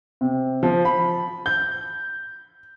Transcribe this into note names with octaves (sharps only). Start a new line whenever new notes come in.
C3
F3
B5
G6